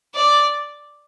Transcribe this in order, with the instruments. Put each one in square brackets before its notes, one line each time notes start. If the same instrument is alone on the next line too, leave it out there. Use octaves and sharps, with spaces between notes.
[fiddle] D5